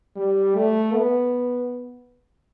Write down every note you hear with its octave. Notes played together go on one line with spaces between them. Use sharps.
G3
A3
B3